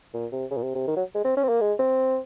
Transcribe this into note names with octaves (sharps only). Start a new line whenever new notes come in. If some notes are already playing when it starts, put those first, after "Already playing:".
A#2
C3
C#3
A#2
C3
C3
D#3
F#3
G#3
C4
C#4
C4
A#3
G#3
C4